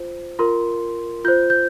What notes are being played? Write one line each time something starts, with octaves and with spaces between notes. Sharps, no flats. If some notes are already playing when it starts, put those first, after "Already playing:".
Already playing: F4 C5
F4 A#4 C6
F4 C5 G6
G6